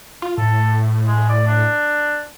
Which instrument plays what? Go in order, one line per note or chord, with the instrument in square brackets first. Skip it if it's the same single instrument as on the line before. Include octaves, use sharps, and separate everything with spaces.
[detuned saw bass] F4
[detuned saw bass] A2 [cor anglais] A4
[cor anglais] G#3
D5
D4